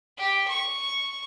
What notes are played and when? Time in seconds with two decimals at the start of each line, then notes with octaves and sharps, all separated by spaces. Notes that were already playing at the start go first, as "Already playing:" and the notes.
0.17 G4
0.48 C#6